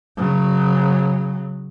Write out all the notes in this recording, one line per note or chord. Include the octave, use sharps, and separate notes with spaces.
C#3 F#3